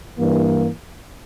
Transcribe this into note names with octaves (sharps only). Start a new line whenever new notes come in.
G2 E3 A#3